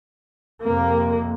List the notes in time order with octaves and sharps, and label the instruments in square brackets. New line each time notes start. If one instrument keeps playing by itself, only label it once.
[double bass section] F2 C3 A#3